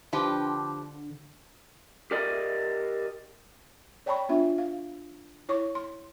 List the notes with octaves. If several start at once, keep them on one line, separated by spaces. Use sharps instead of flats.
D3 F3 G4 B4 A5 C6 D6
G4 A#4 D5 D#5
C#5 D5 G5 A5 B5 C#6
B3 D4 F4 E5
F5
E4 C#5 C#6 D6
C6